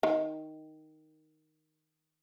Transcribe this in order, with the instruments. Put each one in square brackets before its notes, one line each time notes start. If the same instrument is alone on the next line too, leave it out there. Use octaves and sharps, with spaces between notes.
[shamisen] D#3